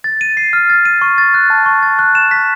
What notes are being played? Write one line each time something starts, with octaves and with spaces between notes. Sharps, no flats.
A6
D#7
C7
F6
A6
D#7
C#6
A6
F#6
A5
C#6
A6
F#6
E7
B6